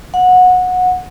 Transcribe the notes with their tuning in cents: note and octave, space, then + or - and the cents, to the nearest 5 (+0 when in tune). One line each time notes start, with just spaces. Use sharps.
F#5 -20